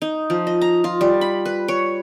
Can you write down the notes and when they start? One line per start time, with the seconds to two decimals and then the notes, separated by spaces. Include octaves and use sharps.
0.02 D#4
0.30 F3
0.47 D#5
0.62 A#5
0.84 F4
1.01 G3
1.21 B5
1.45 B4
1.68 C#5